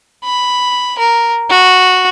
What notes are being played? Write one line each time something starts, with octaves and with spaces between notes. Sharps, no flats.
B5
A#4
F#4